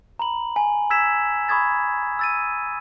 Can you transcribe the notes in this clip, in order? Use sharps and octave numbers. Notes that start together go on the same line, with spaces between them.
A#5 B5 F#7
G#5
E6 G#6 B6 E7
B5 C#6 D#6 G#6 A6
E6 A6 D#7